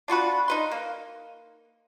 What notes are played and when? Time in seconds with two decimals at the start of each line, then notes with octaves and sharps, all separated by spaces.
0.08 D4 F4 F#4 B4
0.48 D#4 B4 C6
0.71 A#3